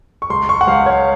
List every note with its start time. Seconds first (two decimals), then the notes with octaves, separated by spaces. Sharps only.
0.22 C#6
0.30 C#2 C6
0.49 C#6
0.61 F#5
0.67 C#2 F5
0.86 C#5